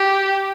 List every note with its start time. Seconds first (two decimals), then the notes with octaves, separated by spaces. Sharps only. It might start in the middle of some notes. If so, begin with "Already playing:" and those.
Already playing: G4